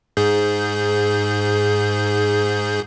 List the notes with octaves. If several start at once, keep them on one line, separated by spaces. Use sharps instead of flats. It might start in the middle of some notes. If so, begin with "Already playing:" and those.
G#2 G#4 G6